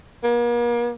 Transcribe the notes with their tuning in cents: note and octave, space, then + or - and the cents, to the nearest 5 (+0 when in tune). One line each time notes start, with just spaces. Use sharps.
A#3 +40